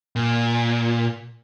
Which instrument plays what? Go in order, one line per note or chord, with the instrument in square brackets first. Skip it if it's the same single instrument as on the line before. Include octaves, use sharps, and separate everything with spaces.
[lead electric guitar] A#2